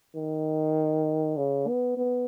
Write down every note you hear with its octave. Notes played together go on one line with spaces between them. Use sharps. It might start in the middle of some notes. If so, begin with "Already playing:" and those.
D#3
C#3
B3
B3